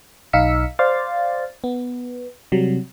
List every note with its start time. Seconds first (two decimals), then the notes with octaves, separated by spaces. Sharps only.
0.33 B1 D#4 F5 E6 B6 C#7
0.79 C5 D5 F5 A6
1.64 B3
2.52 C3 F#3 G3